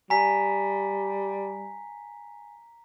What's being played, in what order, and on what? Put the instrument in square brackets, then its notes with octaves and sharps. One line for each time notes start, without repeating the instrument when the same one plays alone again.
[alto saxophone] G3 [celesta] G#5 [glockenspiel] A#5 B6